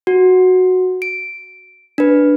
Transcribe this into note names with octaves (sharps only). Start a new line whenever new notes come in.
F#4
D7
D4 B4